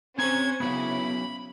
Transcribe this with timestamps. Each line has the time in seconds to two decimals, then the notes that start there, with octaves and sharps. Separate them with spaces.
0.18 C4 C#4 C5 A#5 G#6
0.60 C#3 F#3 B3 E4 B5